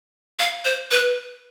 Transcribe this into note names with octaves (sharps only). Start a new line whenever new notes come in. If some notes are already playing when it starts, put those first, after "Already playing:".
F5
C5
B4